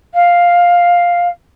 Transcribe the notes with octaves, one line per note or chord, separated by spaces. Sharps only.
F5